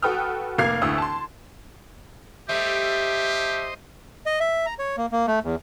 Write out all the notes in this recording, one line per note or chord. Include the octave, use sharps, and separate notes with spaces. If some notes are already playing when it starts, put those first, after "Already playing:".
F#4 A4 B4 G5 D#6 F6
F1 A#3 F5 D6 G#6 C7
D2 E4 D#6 E6
A5 C6
G3 A3 G4 C5 D#5 E5
D#5
E5
A#5
C#5
A#3
A#3
A3
E2